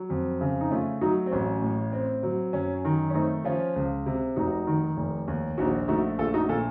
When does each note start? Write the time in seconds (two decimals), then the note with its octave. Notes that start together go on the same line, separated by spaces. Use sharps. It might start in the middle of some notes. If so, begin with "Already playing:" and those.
Already playing: F#3
0.10 F2
0.41 C#3
0.61 D#4
0.71 A3 C#4 F4
1.01 F#3 D#4 F#4
1.26 C4
1.31 A1 C#4
1.62 A2
1.93 C4
2.23 F#3
2.53 F#2 C#4
2.85 D#3
3.10 C#4
3.14 A3 C4 D#4
3.44 F3 C#4 F4
3.76 C#2
4.06 C3
4.36 F1 D#4 F#4
4.67 D#3
4.97 F1
5.28 D#2
5.58 A#1 D#4 F#4
5.88 A3 D#4 F#4
6.18 A#1 F4 A4
6.34 D#4 F#4
6.49 A#2 F4 A4